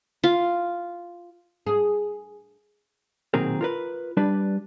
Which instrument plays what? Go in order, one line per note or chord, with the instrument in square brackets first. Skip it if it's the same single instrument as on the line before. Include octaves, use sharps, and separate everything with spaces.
[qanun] F4
[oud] G#4
[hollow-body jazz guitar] B1 A#2 D#3 C4 G#4 A#4
F4 A#4 B4
G3 D4 B4 D5